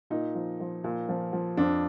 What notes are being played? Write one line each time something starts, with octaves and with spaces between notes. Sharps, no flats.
A#2 D#4
F3
F3
A#2
F3
F3
F2 D4